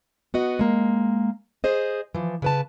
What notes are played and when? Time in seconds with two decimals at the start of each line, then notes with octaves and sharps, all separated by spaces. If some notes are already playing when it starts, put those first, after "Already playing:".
0.34 B3 F#4 D#5
0.59 G#3 A#3
1.64 G#4 C5 D#5
2.14 E3 F3
2.42 C#3 B4 A5